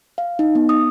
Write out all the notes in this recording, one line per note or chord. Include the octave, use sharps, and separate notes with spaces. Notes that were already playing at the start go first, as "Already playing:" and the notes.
F5
D#4
B3
D#6